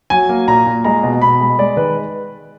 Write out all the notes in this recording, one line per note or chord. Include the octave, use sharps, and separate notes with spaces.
F#3 G#5
A#3
A#2 A#5
A#2
G#3 A#5
B2
B2 B5
G#3
G#3 D5
D#3 B4